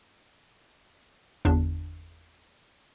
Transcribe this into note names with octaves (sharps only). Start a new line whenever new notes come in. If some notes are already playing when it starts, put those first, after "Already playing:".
G1 E2 D4